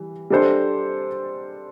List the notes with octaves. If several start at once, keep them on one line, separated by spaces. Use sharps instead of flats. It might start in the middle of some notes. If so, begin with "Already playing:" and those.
Already playing: E3 G3
G3 D4 A4 C5